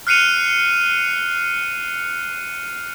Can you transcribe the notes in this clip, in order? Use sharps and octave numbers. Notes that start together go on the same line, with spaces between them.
F6 F#6 C7 C#7 D#7 F7